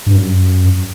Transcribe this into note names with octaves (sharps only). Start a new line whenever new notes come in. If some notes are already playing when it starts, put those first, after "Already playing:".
G2
F#2